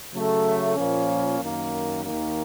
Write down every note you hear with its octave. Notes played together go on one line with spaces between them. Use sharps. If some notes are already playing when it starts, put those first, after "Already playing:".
C#3 F#3 A3
A#2 F3 A#3 C#4
F#2 D#3 A#3
D#2 D#3 A#3